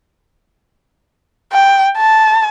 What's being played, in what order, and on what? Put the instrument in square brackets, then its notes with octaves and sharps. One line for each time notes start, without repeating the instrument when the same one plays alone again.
[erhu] G5
A5